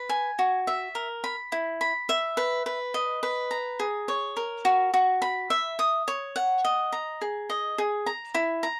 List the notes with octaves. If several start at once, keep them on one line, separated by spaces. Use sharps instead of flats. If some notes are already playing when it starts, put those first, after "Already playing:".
Already playing: B4
G#5
F#4
E5
A#4
B5
E4
B5
E5
B4
B4
D#5
B4
A#5
G#4
C#5
A#4
F#4
F#4
B5
E5
D#6
C#5
F#5
D#5
A#5
G#4
D#5
G#4
A#5
E4
A#5